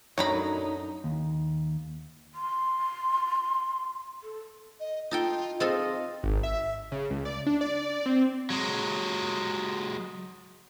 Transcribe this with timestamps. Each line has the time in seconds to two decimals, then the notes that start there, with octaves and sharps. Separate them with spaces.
0.18 F#2 F#3 A3 D4 D#4 A#5 B5
1.04 D#2
2.34 C6
4.23 A4
4.80 D#5
5.11 D#4 F4 A4 G5
5.60 C4 F4 G#4 A4 D#5
6.24 G#1
6.43 E5
6.92 C#3
7.10 C#2
7.25 D5
7.46 D4
7.61 D5
8.06 C4
8.50 F#3 G#3